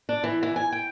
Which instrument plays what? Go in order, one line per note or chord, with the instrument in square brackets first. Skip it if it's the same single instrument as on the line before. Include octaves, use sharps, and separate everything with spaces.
[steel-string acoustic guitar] D4
E3
E3
G#5
G5